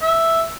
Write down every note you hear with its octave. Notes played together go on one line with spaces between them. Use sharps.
E5